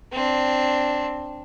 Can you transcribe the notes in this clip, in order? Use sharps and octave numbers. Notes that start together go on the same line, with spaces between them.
C4 D4